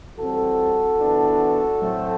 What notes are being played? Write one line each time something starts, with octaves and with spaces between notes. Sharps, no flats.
E3 G3 C4 F#4 A4
E3 B3 D4
A2 F#3 A3 C4